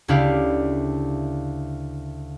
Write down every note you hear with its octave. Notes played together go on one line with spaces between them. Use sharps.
D2 C#3 D4 E4 G4 F5